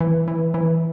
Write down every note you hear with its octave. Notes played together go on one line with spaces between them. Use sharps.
E3
E3
E3